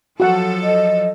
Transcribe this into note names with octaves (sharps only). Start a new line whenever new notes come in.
F3 F#3 F#4 A4 F#5
D#5